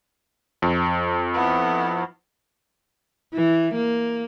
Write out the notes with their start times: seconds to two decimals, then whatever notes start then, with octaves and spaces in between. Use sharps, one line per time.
0.62 F2
1.34 B3 E4
3.34 E3
3.74 A#3